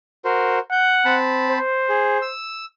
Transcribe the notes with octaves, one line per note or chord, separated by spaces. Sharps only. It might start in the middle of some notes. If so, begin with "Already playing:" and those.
F#4 A#4 C5
F#5 G6
C4 A5 B5
C5
G#4
E6